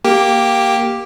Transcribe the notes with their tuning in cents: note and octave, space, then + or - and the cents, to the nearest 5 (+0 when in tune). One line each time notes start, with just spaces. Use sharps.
A#3 +0 G4 +0